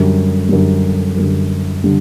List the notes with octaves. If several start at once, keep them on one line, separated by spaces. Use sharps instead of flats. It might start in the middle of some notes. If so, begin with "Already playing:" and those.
Already playing: F#2 D3 G3
F#2 D3 G3
F#2 D3 G3
D3 G3